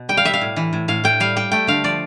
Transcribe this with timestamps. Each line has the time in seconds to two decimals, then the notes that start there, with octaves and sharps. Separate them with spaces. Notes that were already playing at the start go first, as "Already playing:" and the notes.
Already playing: B2
0.09 G3 G5
0.17 F5
0.25 G3 E5
0.33 F5
0.41 A2
0.56 E3
0.73 A2
0.88 A2 F5
1.04 A2 G5
1.20 G3 F5
1.36 G3 G5
1.52 A3 G5
1.67 D3 F5
1.84 F3 D5